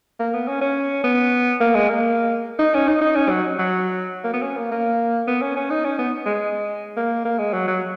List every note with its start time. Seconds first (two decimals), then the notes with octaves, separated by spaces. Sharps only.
0.20 A#3
0.34 B3
0.48 C#4
0.61 C#4
1.04 B3
1.61 A#3
1.75 G#3
1.89 A#3
2.59 D#4
2.74 C#4
2.88 D#4
3.01 D#4
3.15 C#4
3.30 F#3
3.59 F#3
4.24 A#3
4.34 B3
4.43 C#4
4.57 A#3
4.72 A#3
5.28 B3
5.42 C#4
5.57 C#4
5.70 D#4
5.85 C#4
5.99 B3
6.26 G#3
6.97 A#3
7.25 A#3
7.39 G#3
7.53 F#3
7.68 F#3